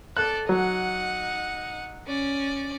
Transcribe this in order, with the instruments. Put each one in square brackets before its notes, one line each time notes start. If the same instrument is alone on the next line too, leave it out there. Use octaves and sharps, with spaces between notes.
[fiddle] A4 D5 [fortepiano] F#6
[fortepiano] F#3 [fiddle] D#4 F#5
[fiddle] C#4 D5